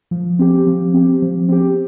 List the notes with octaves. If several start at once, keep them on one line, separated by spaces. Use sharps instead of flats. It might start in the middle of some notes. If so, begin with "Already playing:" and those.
F3
C4 G4
F3
C4 G4
F3
C4 G4